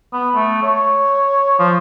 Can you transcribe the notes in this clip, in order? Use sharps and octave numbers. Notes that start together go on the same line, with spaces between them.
B3
A3
C#5
F3